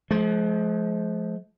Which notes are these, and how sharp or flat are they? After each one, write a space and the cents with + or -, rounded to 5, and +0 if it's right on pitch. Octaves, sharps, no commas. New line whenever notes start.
F3 +0 G#3 +40